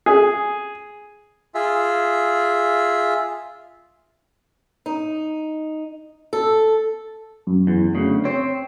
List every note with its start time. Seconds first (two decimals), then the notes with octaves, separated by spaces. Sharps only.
0.06 G#4
1.55 F4 G#4 E5
4.86 D#4
6.33 A4
7.47 F#2
7.67 E2
7.95 D2 C#3
8.25 C4 C#5